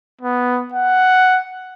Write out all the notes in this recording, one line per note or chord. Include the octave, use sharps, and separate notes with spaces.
B3
F#5